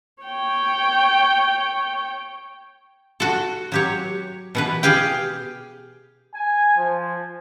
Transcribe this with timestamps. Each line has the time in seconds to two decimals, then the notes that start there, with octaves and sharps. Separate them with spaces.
0.23 C#5 G5
3.20 F#4 A4
3.72 F#3 G4 C#5
4.55 B2 E3 B4
4.83 G4 G#4 F5 G5
6.34 G#5
6.77 F3